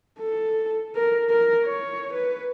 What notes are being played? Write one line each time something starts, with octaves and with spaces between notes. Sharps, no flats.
A4
A#4
A#4
C#5
B4